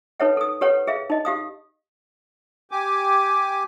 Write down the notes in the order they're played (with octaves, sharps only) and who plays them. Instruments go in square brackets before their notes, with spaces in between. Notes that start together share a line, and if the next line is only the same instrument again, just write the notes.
[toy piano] D#4 A4 B4 C#5 E5 F#5
A4 D#6
G4 A4 B4 C#5 F#5
G#4 E5 F5
D#4 D#5
G4 F5 D#6
[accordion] G4 G#5 D6